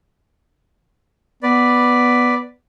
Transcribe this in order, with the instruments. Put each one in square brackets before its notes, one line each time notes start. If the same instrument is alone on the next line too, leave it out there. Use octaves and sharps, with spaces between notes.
[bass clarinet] B3 [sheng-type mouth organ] B4 D5